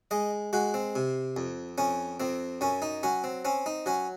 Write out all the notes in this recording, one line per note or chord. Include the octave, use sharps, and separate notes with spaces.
G#3 D#5
G#3 F#4
C4
C3
F2
F2 C#4
F2 C4
F#2 C#4
D#4
F#3 C#4
C4
C4 C#4
D#4
F#3 C#4